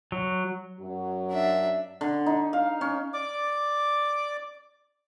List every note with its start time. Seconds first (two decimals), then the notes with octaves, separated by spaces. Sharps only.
0.12 F#3
0.80 F#2 F#3
1.30 D4 E5
2.01 D3
2.26 D#4
2.53 F5
2.81 C#4
3.14 D5 D6